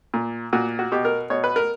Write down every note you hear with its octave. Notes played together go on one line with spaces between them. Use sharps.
A#2
A#2 F#4
F#4
B2 G4
A#4
B2 C#5
B4
A#4